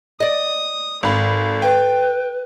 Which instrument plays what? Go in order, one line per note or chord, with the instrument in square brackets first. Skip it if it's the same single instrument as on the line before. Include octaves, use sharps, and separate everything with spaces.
[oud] D5 D#5 [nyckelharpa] D#6
[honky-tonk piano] G#1 B5 [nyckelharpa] A4
[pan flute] B4 [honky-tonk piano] G5